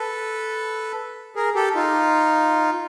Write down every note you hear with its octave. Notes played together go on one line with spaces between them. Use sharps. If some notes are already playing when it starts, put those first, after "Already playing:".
Already playing: A4 B4
G#4 A#4
G4 A4
D#4 F4